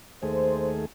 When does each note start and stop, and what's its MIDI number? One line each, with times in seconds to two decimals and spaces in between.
0.23 0.85 39
0.23 0.85 57
0.23 0.85 68
0.23 0.68 72